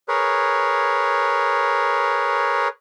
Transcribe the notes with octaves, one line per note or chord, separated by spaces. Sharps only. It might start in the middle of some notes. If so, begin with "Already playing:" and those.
G#4 A#4 B4 C#5